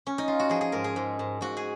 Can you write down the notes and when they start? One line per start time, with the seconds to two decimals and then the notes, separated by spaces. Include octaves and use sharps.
0.07 C#4
0.18 D#4
0.28 F4
0.39 F#4
0.49 F3 G#4
0.61 G#4
0.72 G#2 A#4
0.84 G#4
0.96 G#2
1.19 G#2
1.41 G#2 F#4
1.57 G#4